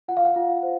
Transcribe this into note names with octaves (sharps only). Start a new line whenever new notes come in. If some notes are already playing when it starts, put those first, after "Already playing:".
F4 F#5
F5
F#5
F4
C5